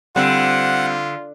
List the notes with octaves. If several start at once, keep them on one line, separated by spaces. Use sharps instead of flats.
D3 G3 C4 F4 C5 F#5